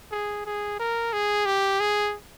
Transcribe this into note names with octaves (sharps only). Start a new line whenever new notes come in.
G#4
G#4
A#4
G#4
G4
G#4